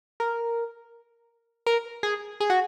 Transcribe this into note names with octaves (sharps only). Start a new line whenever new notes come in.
A#4
A#4
G#4
G#4
F#4